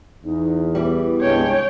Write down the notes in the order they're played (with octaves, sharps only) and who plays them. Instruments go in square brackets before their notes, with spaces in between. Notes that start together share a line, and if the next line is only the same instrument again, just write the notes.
[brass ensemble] E2 [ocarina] D#4
[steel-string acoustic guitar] E3 G3 [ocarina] B3
[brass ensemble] C2 G2 G#3 [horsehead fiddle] C#5 G5